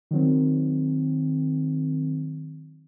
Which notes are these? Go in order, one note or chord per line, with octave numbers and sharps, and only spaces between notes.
D#3 F#3 C4